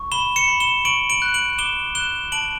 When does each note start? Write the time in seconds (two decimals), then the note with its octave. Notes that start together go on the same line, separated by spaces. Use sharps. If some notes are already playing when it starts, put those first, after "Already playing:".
Already playing: C#6
0.12 B5 E7 G7
0.36 C#7 E7
0.48 B5
0.60 E7 G7
0.85 C#6 D7 F#7
1.10 D7 F#7
1.22 F#6
1.34 D7 F#7
1.58 D6 E7 G7
1.95 F#6 E7 G7
2.32 A5 D7 F#7